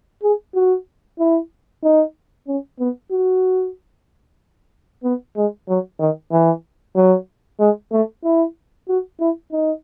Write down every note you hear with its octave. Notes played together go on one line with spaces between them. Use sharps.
G#4
F#4
E4
D#4
C#4
B3
F#4
B3
G#3
F#3
D#3
E3
F#3
G#3
A3
E4
F#4
E4
D#4